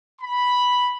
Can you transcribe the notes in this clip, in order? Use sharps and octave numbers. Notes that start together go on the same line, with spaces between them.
B5